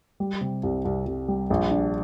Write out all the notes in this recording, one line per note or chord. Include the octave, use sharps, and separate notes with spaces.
G3
C3
C2
C2
C2
G3
A#1
D4